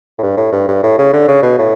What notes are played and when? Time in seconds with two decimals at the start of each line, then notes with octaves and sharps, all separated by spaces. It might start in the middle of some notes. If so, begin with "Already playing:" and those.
0.18 A2
0.23 G2
0.37 A2
0.52 G2
0.68 G2
0.83 A2
0.98 C#3
1.13 D3
1.28 C#3
1.42 B2
1.58 A2